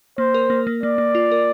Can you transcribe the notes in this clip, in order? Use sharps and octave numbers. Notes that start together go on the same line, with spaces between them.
A#3 C5
A#4
A#3
A#3
A#3 D5
A#3
F4
A#4